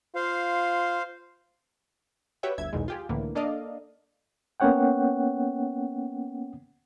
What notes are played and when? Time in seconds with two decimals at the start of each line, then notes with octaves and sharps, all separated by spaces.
0.15 F4 C5 F5
2.43 F#4 G4 B4 C#5 E5 G5
2.58 G1 D2 E5 G#6
2.73 B1 E2 B2 D#3 G#3
2.88 F4 G4 G#4
3.09 C#2 A2 D3 E3 A#3
3.35 A#3 D4 A4 D5 D#5 F5
4.60 A#3 B3 C#4 C#5 F#5 G5